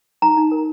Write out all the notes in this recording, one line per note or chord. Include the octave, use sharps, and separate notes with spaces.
D#4 A#5
D#4
A#4